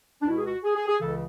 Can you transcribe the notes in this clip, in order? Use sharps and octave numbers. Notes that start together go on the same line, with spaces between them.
D4
C#2 B2 E4
G#4
F#4
G#4
G#4
G#4
C#2 C#3 E3 A4